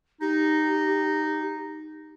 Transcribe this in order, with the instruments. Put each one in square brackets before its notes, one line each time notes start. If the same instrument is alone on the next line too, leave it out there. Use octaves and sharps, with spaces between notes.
[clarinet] D#4 [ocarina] G4